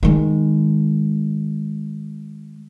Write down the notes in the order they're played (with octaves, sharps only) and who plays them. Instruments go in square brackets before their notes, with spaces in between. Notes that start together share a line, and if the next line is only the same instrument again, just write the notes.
[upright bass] D#3 G#3